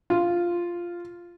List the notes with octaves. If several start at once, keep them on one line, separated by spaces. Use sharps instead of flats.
F4